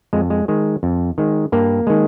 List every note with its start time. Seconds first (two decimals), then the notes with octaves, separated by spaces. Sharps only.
0.13 F2 G#3
0.30 G#3
0.48 D#3 G#3
0.83 F2
1.18 D#3 G#3
1.52 G2 A#3
1.87 D#3 G#3